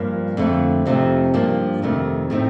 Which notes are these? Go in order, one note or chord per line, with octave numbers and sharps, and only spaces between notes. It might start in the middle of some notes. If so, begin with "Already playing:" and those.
Already playing: G2 F3 A#3
F2 D3 A3
F2 C3 F3 A3 D#4
G2 F3 A#3 D4
F2 C3 D#3 A3
A2 A3 C4 D#4